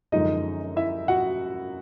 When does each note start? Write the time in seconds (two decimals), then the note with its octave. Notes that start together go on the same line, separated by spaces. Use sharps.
0.12 F#2 D3 F3 G#3 D#4 D#5
0.76 E4 E5
1.08 F#4 F#5